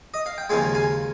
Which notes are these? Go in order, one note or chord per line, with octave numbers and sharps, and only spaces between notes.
D#5
F5
G5
D#2 C#3 F3 G#3 F5 G#5
F5 G#5